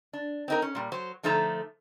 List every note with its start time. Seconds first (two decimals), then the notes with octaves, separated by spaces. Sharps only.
0.13 D4
0.48 C4 D#4 A#4
0.62 C#4
0.75 A#2 G3
0.92 F#3 C5
1.23 D3 F3 A3 D#4 A4 A#5